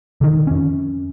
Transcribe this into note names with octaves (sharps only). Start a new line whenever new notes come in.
D3 D#3
F2 C#4